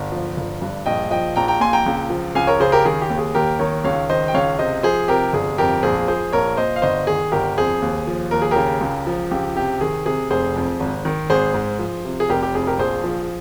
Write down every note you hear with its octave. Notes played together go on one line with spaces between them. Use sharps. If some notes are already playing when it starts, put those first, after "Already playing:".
Already playing: G1
F3
G1
G2
A#1 D#5 G5
F3 D#5 G5
A#1 G5 A#5
G5 A#5
A#2 G#5 C6
G5 A#5
C#2
F3
C#2 F5 G#5
A#4 C#5
C#3 G#4 C5
G4 A#4
D#3 G#4
G4
D#2
G#4
D#2 G4 A#4
D#3 A#4 C#5
C#2 C#5 F5
D#3 C5 D#5
G5
C#2 C#5 F5
C3 C5 D#5
F3 G#4 C5
C3 G4 A#4
G1 G#4
F2 G4 A#4
A#1 G#4 C5
F3 G#4 C5
A#1 A#4 C#5
A#2 C5 D#5
F5
G1 C5 D#5
D#3 G#4
G1 G4 A#4
F2 G#4 C5
D#2
F3
D#2 A#4
G#4
C#3 G4 A#4
C#2
F3
C#2 G4
C3 G4
D#3 G#4
C3 G#4
F1 G#4 C5
F2
G#1
D#3
G#1 G#4 C5
G#2
F3
C3
G#4
F1 G4 A#4
G4
F2 G#4
G4 A#4
A#1 G#4 C5
F3